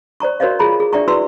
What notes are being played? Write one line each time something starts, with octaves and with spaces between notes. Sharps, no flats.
C5 D5 A#5 C#6
F#4 A#4 C5 C#5 D#5 F5
F4 G#4 A#5 B5
G#4
D4 D5 E5 G5 A#5 C#6
E4 F#4 B4 C6 E6